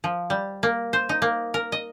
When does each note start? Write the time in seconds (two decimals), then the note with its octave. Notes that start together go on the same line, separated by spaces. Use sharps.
0.04 F3
0.30 G3
0.63 A#3
0.93 C5
1.09 D#4
1.22 A#3
1.54 A#4
1.72 D#5